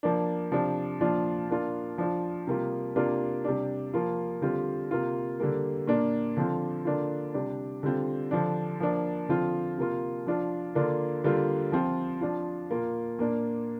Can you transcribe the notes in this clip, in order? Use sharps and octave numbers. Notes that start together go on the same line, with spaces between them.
F3 A#3 D4
C3 F3 D4
A#2 F3 D4 F4
A#2 A#3 D4 F4
F3 D4 F4
C3 G3 A#3 F4
C3 A#3 D4 F4
C3 G3 D4
F3 A#3 F4
D3 G3 C4 F4
C3 A#3 F4
D3 G3 A#3
A#2 A#3 D4
D3 F3 C4 F4
D3 A#3 D4 F4
C3 G3 D4
D3 G3 C4 F4
D3 F3 D4
F3 A#3 D4
D3 F3 C4 F4
C3 A#3 F4
F3 D4 F4
D3 A#3 D4 F4
D3 G3 A#3 F4
F3 C4 F4
F3 D4 F4
A#2 A#3 F4
A#2 A#3 D4